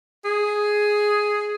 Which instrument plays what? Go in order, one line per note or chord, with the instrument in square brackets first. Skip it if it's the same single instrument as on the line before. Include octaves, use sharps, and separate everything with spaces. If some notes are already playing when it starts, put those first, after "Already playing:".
[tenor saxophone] G#4